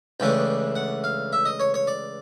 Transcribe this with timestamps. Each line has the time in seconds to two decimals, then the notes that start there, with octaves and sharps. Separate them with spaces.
0.20 C#2 C#3 E3 A3 D4 G5
0.76 F#5
1.04 F5
1.33 E5
1.46 D#5
1.60 C#5
1.74 C#5
1.87 D5